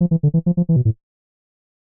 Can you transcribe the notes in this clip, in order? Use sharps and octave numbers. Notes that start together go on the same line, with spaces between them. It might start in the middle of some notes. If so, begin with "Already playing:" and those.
F3
E3
D3
E3
F3
F3
E3
B2
A2